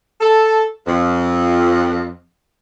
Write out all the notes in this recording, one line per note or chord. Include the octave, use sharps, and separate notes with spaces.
A4
F2